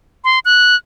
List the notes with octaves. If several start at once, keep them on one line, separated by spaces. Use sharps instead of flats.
C6
F#6